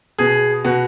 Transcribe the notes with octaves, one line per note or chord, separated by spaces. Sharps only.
B2 G#4
B2 F#4